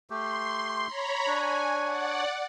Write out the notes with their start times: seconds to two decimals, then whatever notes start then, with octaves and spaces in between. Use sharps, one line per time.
0.10 A3 G4 C6
0.86 C#5 A#5 B5
1.27 D4 C#5 G#5
1.84 D5 F#5